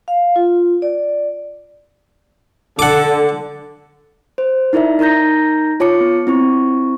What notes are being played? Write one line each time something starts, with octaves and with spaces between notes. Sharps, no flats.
F5
F4
D5
D3 A4 F#5 D6
C5
D#4 E4 A#4 D5 E5
D#4 A#4 A#5 G6 A#6
F4 C#5 A5 D6 C#7
B3
C4 E4 C#6